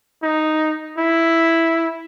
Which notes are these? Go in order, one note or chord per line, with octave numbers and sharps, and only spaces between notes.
D#4
E4